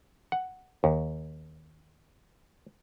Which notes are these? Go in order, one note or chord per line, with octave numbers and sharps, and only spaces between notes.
F#5
D#2